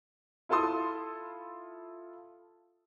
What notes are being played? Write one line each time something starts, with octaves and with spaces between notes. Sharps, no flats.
E4 F4 A4 A5 C6 D#6